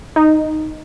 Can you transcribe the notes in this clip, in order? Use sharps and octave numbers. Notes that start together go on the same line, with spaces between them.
D#4